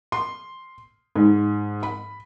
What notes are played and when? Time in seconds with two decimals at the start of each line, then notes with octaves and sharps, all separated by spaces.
0.12 C6
1.16 G#2
1.83 B5